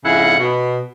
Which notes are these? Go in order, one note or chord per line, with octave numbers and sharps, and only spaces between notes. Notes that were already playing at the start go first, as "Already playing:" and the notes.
F2 G#2 C#3 E4 F#5
B2